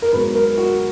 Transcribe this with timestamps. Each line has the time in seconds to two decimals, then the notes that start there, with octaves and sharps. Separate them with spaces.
0.02 A#4
0.12 G#2 F#3 B3 B4
0.35 A#4
0.58 F#4